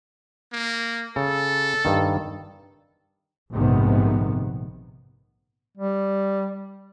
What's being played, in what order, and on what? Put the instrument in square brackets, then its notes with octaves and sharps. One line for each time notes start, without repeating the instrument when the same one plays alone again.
[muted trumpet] A#3
[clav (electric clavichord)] C#3 [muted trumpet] A4
[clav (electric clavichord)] G2 D#3
[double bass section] F1 A#1 G#2 C3 D#3 B3
[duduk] G3